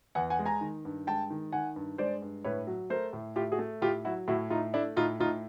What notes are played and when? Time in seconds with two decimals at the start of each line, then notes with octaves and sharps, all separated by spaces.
0.15 E2 F#5 G#5
0.30 F#5 G#5
0.39 G#3
0.46 G#5 A#5
0.61 D#3
0.85 G2
1.07 G#3 G5 A5
1.30 D#3
1.52 D#3 F#5 G#5
1.76 G2
1.98 G#3 C5 D5
2.22 G2
2.44 A2 B4 C#5
2.67 F#3
2.90 A3 A#4 C5
3.13 A2
3.36 A2 F4 G4
3.52 F#4 G#4
3.59 A3
3.82 A2 F4 G4
4.05 F#3 E4 F#4
4.28 A2 E4 F#4
4.50 A2 D#4 F4
4.74 A3 D4 E4
4.96 A2 D#4 F4
5.20 A2 D#4 F4